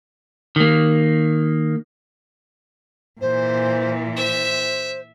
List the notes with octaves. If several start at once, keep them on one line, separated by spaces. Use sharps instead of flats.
D#3 A#3
A#2 E3 C5
C5 E5